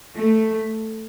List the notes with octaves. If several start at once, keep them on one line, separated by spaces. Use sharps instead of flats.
A3